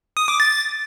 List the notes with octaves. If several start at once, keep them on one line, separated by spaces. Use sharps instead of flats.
D#6
D6
A6